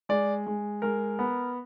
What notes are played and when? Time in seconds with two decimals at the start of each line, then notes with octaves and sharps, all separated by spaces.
0.09 G#3 D5
0.46 G#3
0.82 G#3 A#4
1.19 B3